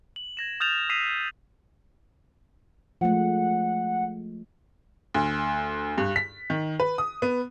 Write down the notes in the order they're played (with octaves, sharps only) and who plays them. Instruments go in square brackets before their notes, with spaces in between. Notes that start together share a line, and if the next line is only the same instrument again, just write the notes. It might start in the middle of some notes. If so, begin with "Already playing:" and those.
[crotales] F#7
G#6 A#6 E7
D#6 F6 G6 A6 E7 F7
D#6 E6 B6 C7 D#7 F7
[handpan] F3 G#3 A3 [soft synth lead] F#5
[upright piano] D2
G2
B6
D#3
B4
D#6
B3